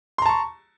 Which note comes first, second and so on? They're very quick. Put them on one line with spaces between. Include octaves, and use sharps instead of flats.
C6 A#5 A5 C#6